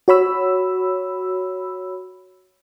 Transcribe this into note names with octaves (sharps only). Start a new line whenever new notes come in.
F#4 C#5 B5 E6